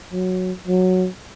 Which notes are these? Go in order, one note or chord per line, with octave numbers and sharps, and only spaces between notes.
F#3
F#3